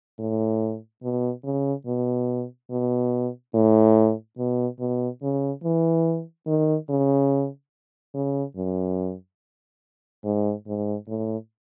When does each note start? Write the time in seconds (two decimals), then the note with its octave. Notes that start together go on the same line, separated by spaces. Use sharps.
0.19 A2
1.03 B2
1.44 C#3
1.86 B2
2.71 B2
3.54 A2
4.38 B2
4.79 B2
5.22 C#3
5.64 E3
6.47 D#3
6.89 C#3
8.14 C#3
8.56 F#2
10.24 G#2
10.66 G#2
11.08 A2